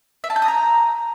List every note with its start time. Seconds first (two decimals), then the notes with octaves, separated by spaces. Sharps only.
0.24 E5
0.30 A5
0.36 G6
0.42 D#6
0.48 A#5